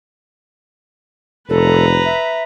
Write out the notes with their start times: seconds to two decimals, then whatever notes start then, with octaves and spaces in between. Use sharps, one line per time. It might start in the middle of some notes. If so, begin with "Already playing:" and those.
1.50 F1 A4 B4 A#5
2.05 E5